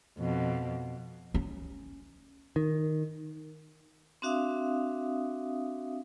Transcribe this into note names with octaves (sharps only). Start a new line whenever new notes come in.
F2 B2
C#4
D#3
C4 D4 F#4 E5 F5 D#6